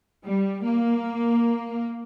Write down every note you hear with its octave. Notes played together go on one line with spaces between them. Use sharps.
G3
A#3